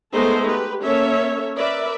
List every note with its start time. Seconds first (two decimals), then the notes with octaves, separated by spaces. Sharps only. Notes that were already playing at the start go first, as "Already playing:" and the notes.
0.13 G#3 A3 B3 D#4 A4 C5
0.47 G4 B4
0.84 A#3 C#4 A4 C#5 E5
1.55 A#4 B4 D5 E5